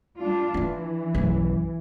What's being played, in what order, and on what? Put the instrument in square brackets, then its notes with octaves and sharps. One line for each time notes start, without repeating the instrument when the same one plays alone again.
[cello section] G3 D4 F4
[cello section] E3 [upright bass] D4 E4
[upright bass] B1 F#2